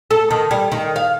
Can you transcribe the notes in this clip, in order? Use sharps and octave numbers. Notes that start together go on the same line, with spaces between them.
A4
D#3
G3
D#3
F5